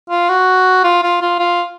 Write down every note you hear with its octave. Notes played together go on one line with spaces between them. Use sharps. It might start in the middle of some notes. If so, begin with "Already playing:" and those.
F4
F#4
F4
F4
F4
F4